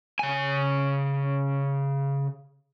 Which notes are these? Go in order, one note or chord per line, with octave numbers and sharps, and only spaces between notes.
C#3 G#5